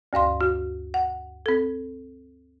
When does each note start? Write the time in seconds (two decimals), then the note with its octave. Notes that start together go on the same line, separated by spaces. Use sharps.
0.13 D2 G2 F5 C6
0.41 F#4
0.94 F#5
1.46 C4 A4